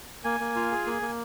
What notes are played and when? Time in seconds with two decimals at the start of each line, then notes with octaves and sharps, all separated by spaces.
0.24 A#3 G#5
0.40 A#3
0.56 F4
0.71 G#4
0.86 A#3
1.02 A#3